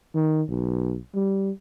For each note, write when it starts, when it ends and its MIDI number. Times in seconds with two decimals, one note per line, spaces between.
0.15 0.42 51
0.48 0.98 35
1.15 1.50 55